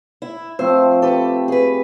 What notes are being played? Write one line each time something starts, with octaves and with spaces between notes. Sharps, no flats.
E4
F3 A3 C4 C5
G4 A4 B4
G#4 B4 G5